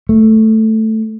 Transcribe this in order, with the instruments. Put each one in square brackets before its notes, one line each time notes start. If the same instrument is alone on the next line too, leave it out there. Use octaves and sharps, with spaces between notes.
[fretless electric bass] A3